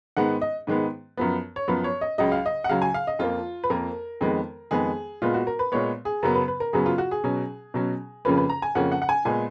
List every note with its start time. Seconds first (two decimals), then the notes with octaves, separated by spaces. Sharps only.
0.17 G#2 D#3 G#3 B3 F#5
0.41 D#5
0.67 G#2 D#3 G#3 B3
1.17 F#2 F3 B3
1.56 C#5
1.68 F#2 F3 B3 B4
1.84 C#5
2.01 D#5
2.18 C#2 C#3 F#3 D#5
2.32 F5
2.46 D#5
2.64 F#5
2.69 C#2 C#3 F#3 F5
2.82 G#5
2.94 F5
3.07 D#5
3.19 F2 F3 A#3 F4
3.64 B4
3.70 F2 F3 A#3 A#4
4.21 F2 D#3 G#3 B3
4.71 F2 D#3 G#3 B3 G#4
5.22 A#2 G#3 B3 F4
5.34 F#4
5.47 A#4
5.59 B4
5.72 A#2 G#3 B3 C#5
6.05 G#4
6.23 F#2 C#3 F#3 B3 A#4
6.35 B4
6.48 B4
6.60 A#4
6.73 F#2 C#3 F#3 B3 G#4
6.86 F4
6.98 F#4
7.11 G#4
7.24 B2 F#3 C#4
7.74 B2 F#3 C#4
8.25 F2 C#3 F3 A#3 C#4 B4
8.37 B4
8.50 A#5
8.62 G#5
8.75 F2 C#3 F3 A#3 C#4 F#5
8.92 F#5
9.02 F#5
9.09 G#5
9.25 A#2 G#3 B3 G#5